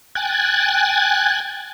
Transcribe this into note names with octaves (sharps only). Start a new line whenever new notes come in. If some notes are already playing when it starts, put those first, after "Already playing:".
G5 G#5 F#6 G#6 A6